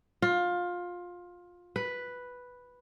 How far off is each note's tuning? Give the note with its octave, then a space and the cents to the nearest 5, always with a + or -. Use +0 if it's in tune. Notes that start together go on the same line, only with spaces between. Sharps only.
F4 +20
B4 +0